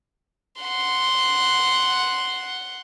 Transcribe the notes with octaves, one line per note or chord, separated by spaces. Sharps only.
F#5 C6